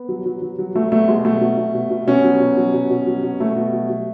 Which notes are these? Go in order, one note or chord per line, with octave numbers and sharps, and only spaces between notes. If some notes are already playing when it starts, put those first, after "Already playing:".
Already playing: B3
F#3
F#3
F#3
F#3
F#3 A3
B2 A3
B2 G#3
F#3 A3
B2
B2
B2
B2
B2 C#4
F#3
B2
F#3
B2
B2
F#3
B2
B2 A3
B2
F#3
F#3